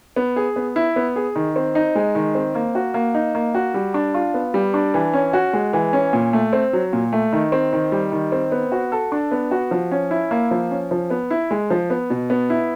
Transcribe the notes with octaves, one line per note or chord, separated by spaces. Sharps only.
B3
G#4
B3
E4
B3
G#4
D#3
C4
D#4
G#3
D#3
C4
A#3
F#4
A#3
D#4
A#3
F#4
G3
D4
F4
B3
G3
D4
E3
C#4
F#4
G#3
E3
C#4
A#2
A3
C4
F#3
A#2
A3
D#3
C4
D#3
G3
D#3
C4
B3
F#4
A4
D4
B3
F#4
F3
C#4
E4
A#3
F3
C#4
F3
B3
E4
G#3
F3
B3
B2
B3
E4